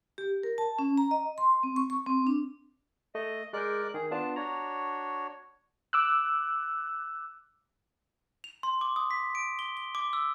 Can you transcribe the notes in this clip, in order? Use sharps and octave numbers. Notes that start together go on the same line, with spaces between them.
G4
A#4
A5
C#4
A#5
D#5
C6
C4
C#6
C#6
C4
D4
A3 D#5
G#3 A#4 D5 F#6 G6
D#3 G#4
B3 D4 F4 A5
D4 F#4 C#5 A#5
D6 E6 F#6
F7
C6
D6
D#6
B6
D7
G7
G7
D6
E6